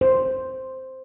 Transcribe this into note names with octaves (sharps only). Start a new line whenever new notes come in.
C5